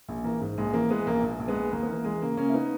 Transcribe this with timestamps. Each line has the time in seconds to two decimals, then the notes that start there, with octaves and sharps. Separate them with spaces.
0.09 A#1
0.24 E3 A#3
0.41 G#2
0.58 A#1 G#3
0.73 E3 A#3
0.90 E3 G#3 B3
1.07 A#1 A#3
1.23 A#1
1.40 A#1
1.48 G#3 B3
1.56 A#1
1.72 D#2 A#3
1.83 B3
1.89 E3 A#3
2.05 E3 G#3
2.22 C#3 A#3
2.37 C#3 A#3 C#4
2.49 E4
2.54 B3 D#4